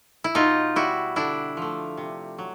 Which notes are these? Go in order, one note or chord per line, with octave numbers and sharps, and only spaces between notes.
E4
B2 D#4 F4
G3 E4 F#4
D3 D4 E4
F3 A3
C3
F#3